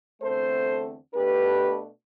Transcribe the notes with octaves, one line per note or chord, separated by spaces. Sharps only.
E2 D3 A3 C4 A4 C5
B2 A3 D4 G4 B4